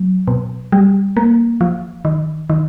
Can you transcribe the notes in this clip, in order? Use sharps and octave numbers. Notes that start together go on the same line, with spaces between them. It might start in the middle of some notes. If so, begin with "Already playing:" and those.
Already playing: F#3
B2
G3
A#3
F3
D#3
D#3